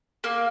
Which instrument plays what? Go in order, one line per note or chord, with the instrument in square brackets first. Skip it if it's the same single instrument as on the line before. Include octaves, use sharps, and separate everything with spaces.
[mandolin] A#3